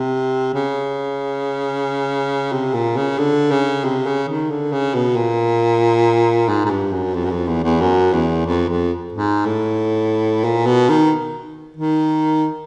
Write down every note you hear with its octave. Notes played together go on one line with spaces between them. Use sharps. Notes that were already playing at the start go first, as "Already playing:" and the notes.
Already playing: C3
C#3
C3
A#2
C#3
D3
C#3
C3
C#3
D#3
D3
C#3
B2
A#2
G#2
G#2
G2
F#2
F2
F#2
F2
E2
E2
F#2
E2
F2
F2
G#2
A2
A#2
B2
D#3
D#3